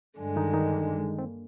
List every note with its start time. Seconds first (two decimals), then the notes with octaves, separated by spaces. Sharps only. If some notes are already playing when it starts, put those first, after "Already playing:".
0.19 G2 D3 G#3
0.36 D#3 D#4
0.54 D#3 D#4
0.98 G#3
1.19 C4
1.23 A#3